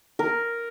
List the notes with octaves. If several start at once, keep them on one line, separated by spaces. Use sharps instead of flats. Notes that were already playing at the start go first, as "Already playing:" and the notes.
A#4